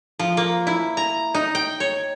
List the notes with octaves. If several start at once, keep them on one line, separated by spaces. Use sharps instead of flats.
F3
A#3
E4
A#5
D#4
G5
C#5